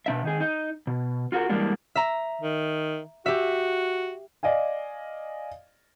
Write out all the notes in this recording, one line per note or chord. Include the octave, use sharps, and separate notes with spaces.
B2 D4 E5
D#3 D#4 G#4
D#4
B2
F4 F#4 G#4 A#4
E3 G3 G#3 A#3 D4
E5 A#5
D#3
F#4 G4 E5
D5 D#5 F5 G#5